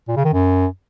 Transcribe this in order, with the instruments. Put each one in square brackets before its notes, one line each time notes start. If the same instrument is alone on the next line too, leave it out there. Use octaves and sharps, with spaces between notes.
[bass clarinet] A#2
C#3
D#3
F#2